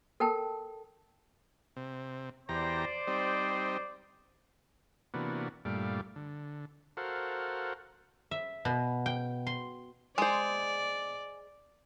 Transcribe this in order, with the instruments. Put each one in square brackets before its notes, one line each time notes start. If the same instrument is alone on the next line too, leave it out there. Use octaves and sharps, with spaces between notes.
[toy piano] A4 A#4 G5 A5
[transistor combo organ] C3
[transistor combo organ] E2 G4 A#5 [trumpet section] C5 D5
[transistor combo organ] G3 C4 D#4
C3 E3 A#3 B3 D4 F#4
G2 A#2 G3 A3 F5 D6
D3
F#4 A4 A#4 C5 F5 F#5
[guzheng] E5
B2
G5
C6
[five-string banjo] G#3 C5 [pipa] G#4 [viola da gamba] D5